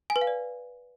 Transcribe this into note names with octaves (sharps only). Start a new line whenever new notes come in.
G#5
B4
F5
D5